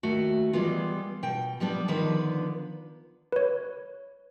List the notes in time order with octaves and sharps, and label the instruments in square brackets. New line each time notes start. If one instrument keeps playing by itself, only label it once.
[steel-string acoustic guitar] D#2 A3 F#4
E3 G3 G#3 B3 F4
B2 G5
F3 G3 B3 D4
D3 D#3 F3 B3 D4 B4
[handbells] B4 C#5